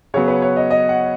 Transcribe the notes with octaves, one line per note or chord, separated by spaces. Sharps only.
C#3 F#3 B3 C#5
B4
C#5
D#5
D#5
F#5